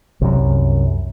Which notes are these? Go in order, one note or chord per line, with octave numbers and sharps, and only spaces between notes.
C2 F#2